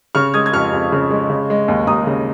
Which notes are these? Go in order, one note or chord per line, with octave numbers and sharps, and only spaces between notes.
C#3 C#6 F6
G#3 D#6 G#6
G#6
F2 C#6 F6
F2
C#3
G#3
C#3
G#3
D#2
D#2 A#5 D#6
C#3